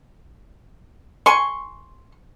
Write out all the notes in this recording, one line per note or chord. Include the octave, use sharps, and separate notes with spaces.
G#5 C6 C#6